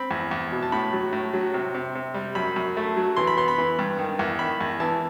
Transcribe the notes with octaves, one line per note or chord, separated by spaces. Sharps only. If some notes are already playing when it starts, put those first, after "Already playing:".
Already playing: C4 B5
E2
E2
B2
A5
A2 B5
F#3
A2
F#3
C3
C3
C3
G3
F#2 B5
F#2
A3
F#3
E3 C6
B5
B3 C6
B5
E3
G2
D#3
E2
D#3 B5
E2
E3 A5